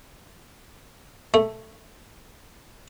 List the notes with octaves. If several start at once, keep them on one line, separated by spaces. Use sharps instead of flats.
A3